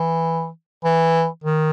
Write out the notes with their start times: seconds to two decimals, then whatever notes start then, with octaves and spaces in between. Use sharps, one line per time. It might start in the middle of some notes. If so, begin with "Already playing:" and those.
Already playing: E3
0.84 E3
1.44 D#3